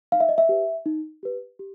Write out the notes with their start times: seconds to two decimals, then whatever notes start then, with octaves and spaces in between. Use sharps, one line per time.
0.12 D#4 F5
0.20 E5
0.29 D#5
0.38 E5
0.49 G4 B4
0.86 D#4
1.23 G4 B4
1.59 G4